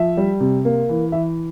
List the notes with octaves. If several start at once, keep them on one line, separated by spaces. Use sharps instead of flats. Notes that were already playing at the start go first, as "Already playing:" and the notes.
Already playing: F3 E5
G3
C3
A#3
E3
E3 E5